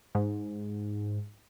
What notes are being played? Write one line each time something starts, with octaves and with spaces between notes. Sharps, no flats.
G#2